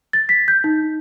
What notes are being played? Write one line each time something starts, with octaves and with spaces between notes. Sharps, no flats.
A6
B6
G6
D#4